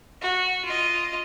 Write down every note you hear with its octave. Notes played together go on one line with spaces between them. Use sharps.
F#4
F4 D#5